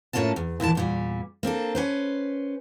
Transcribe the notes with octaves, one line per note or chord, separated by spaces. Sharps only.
A2 A3 A#3 C#4 F4 A5
E2
D#2 A#2 E3 A5
E2 A#2 G3
A#3 C4 D4 A4
C#4 B4 C5